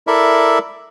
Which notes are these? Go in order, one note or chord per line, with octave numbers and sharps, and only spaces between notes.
E4 A4 A#4 D5 E5